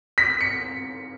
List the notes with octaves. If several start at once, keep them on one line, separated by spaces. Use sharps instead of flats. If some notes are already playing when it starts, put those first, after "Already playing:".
B6
C#7